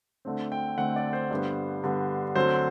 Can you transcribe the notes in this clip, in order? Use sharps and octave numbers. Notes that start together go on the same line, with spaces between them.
D2 D3 A3 C4
G5
D2 D3 A3 C4 F#5
D5
C5
G2 D3 G3 B3
G2 D3 G3 B3
D2 D3 F#3 C4 C5